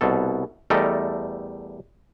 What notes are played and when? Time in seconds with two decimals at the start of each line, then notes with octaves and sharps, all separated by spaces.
0.01 C2 B2 A4
0.70 E2 G3 A3 A4 A#4 D#5